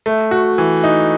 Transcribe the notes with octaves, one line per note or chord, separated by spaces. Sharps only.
A3
F#4
E3
D#4